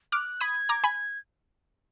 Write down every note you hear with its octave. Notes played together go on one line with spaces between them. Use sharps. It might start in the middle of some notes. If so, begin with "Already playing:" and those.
D6 F6 F#6
B5 D#6 G#6
A#5 D6
G#5 B5